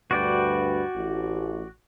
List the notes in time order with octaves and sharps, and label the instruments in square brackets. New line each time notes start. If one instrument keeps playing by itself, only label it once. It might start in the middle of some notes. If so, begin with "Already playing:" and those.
[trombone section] D2 G2 B4 [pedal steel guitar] F#4 D5 G5
[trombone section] A1